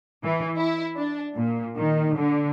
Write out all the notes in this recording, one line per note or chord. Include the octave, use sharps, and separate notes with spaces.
E3
E4
D4
A#2
D#3
D3